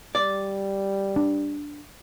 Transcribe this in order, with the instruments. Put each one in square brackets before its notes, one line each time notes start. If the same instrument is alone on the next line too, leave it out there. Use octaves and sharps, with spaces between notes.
[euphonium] G3 [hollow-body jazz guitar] D5
[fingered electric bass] D4